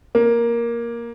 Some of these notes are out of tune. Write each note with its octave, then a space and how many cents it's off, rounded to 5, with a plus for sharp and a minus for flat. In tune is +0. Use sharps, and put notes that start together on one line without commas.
A#3 +10